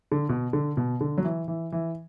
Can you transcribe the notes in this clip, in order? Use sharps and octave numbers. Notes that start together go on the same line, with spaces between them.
D3
B2
D3
B2
D3
F#3
E3
E3
E3